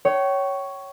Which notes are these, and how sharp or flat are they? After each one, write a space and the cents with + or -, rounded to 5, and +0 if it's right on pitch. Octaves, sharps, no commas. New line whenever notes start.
C#5 +5 G5 -35